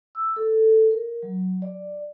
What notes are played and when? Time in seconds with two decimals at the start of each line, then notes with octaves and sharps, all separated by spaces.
0.15 E6
0.36 A4
0.91 A#4
1.23 F#3
1.62 D5